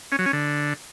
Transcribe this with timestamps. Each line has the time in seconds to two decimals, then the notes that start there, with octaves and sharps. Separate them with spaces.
0.12 C#4
0.19 F#3
0.26 C#4
0.33 D3